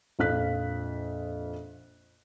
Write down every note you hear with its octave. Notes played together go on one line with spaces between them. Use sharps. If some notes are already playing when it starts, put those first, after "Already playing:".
A#1 F2 F5 F#6 B6